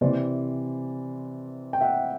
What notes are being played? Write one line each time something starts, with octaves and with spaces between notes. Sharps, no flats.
C3 E3 C5 D5
G5
E5 F#5